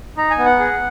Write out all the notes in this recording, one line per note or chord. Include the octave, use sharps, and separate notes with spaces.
D#4 A#5
G#5
B3
F#5
G#4